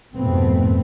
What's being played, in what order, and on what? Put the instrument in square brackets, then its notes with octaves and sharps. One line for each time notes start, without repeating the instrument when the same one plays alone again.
[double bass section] F2 G#2 B2 A3 B3 C4